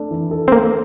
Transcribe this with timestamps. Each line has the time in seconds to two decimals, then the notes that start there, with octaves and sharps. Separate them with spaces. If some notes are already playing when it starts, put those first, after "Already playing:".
Already playing: A3 D4 A4
0.11 E3
0.31 A4
0.48 C4
0.52 A3 A#3